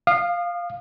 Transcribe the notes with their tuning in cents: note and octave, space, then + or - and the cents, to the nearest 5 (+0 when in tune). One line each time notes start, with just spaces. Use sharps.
F5 +0 D#6 -35